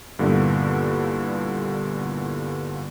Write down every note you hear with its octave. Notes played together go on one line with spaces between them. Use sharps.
G2 A#2 D3 A#3 B3 E4